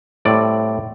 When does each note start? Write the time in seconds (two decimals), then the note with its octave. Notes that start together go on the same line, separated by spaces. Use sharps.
0.25 A2 G3 C4 D5